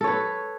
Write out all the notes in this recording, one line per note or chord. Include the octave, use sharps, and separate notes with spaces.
A4 B4 C#5